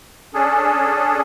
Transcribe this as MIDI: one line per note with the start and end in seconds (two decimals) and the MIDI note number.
0.34 1.21 61
0.34 1.21 62
0.34 1.21 68
0.34 1.21 69